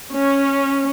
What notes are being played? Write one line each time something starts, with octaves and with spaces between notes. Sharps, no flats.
C#4